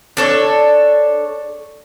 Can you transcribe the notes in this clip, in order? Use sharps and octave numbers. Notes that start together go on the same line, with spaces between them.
D4 A4 C#5